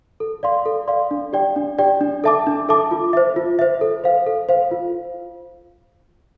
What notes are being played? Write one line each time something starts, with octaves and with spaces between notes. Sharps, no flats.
A4
D5 F5 C6
A4
D5 F5 C6
D4
G4 D5 G5
D4
G4 D5 G5
D4
A4 E5 A5 D6
D4
A4 E5 A5 D6
F4
C5 E5
F4
C5 E5
A4
C5 F5
A4
C5 F5
F4